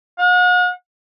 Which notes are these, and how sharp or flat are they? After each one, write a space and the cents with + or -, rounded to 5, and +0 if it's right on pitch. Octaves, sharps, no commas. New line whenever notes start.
F#5 -45